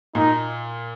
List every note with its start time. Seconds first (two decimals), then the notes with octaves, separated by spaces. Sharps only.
0.15 A#2 D#4